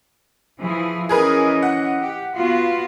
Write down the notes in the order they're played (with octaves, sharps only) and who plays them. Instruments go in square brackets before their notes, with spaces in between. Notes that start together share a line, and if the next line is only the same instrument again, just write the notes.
[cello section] E3 F3 G#4
[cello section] E3 C#4 D#5 [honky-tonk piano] G#4 A#4 B4
[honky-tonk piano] F#5
[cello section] G4
B3 F4 F#4